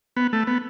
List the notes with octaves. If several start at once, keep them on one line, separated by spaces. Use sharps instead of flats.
B3
A3
B3